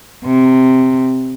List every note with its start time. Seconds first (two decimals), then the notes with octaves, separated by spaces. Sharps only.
0.25 C3